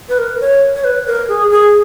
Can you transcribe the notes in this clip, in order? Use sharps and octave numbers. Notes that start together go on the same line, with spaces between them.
B4
A#4
C#5
C#5
B4
A#4
G#4
G#4